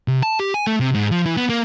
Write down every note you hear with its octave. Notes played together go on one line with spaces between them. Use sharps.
C3
A5
G4
G#5
A3
C3
G#2
F3
E3
B3
A#3